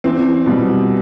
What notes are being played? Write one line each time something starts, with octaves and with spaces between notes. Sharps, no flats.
E2 C4
B2 G3